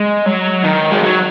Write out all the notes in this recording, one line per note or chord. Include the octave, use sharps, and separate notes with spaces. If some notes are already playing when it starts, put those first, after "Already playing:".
Already playing: G#3
F#3
D#3
G#3
F#3